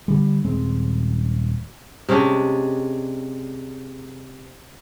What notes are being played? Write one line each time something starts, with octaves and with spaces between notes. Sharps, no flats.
D3 G3
D#1 G#3 C4
C3 G#3 C#4 D4